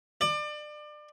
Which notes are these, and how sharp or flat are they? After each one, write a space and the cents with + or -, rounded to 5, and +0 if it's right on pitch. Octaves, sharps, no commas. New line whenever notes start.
D5 +30